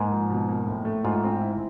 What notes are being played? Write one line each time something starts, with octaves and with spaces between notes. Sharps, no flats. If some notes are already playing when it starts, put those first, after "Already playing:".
Already playing: G#2 A#3
F3
B2
A#3
A2
A3
G#2 F4
C4
E4